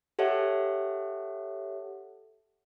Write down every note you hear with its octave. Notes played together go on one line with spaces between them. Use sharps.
G4 A4 C#5 E5 F#5